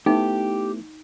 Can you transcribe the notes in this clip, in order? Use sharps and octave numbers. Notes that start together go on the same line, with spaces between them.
A3 B3 D#4 E4 G4